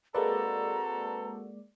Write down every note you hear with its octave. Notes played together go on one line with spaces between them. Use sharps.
G#3 A#3 C4 F#4 A4 B4 D5 A#5